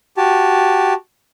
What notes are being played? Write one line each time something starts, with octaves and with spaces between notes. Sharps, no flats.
F#4 G4 A5